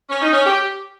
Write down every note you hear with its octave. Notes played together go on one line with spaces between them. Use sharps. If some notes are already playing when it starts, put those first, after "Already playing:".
C#4
D#4
C#4
G4